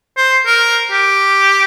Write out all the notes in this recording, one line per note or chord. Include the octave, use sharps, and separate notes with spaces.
C5
A#4
G4